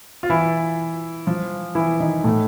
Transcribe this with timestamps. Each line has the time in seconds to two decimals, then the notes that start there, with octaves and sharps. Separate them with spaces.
0.23 F4
0.30 E3 E4
1.27 F3 F4
1.75 E3 E4
2.00 D#3 D#4
2.24 A2 A3